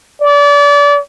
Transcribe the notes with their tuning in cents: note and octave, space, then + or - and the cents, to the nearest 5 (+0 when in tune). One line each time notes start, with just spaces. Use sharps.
D5 -30